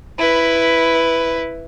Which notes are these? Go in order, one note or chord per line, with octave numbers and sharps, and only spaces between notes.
E4 B4